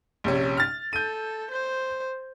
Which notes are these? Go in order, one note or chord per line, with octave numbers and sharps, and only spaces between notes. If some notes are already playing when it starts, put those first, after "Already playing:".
A#1 C3 C#4
F6 A6
A4 G6 D#7
C5